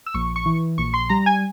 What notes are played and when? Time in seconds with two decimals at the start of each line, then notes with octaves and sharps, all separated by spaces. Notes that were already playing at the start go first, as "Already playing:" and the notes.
0.06 E6
0.14 A#1 C#6
0.36 C#6
0.46 E3
0.78 A#1 C#6
0.94 C6
1.09 G3 A#5
1.26 G#5